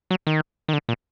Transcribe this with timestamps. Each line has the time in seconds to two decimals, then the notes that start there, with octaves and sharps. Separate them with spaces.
0.11 F#3
0.27 D#3
0.68 D#3
0.73 D3
0.89 A#2